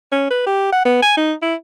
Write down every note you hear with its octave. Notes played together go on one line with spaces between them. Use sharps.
C#4
B4
G4
F#5
B3
G#5
D#4
E4